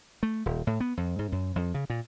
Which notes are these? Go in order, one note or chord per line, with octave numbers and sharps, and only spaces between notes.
A3
D#1
A2
B3
F2
G#2
F#2
F2
C#3
A#2